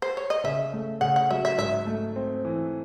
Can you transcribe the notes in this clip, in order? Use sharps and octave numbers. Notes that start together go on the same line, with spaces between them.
C5
C#5
D#5
C#3 E5
A3
C#3 F#5
F#5
F#3 E5
E5
G#2 E5
A3
C4
E3